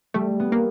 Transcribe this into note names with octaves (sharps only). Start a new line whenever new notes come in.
G3 A3
B3
A#3